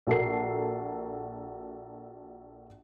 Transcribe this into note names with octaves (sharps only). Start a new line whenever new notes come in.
A#1 F#4 A4 A#4 C7